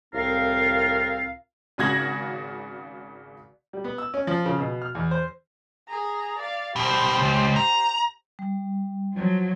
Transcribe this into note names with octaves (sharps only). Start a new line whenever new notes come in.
C2 A2 C4 F4 A#4 F5
G#1 C#3 F#4 G#6 A#6 F#7
G3
B3
E6
C#4
F3
C#3
B2
F6
E2
C5
G#4 A#5
D5 F5
C2 B2 G4 C5
C#2
A#5
G3
F3 F#3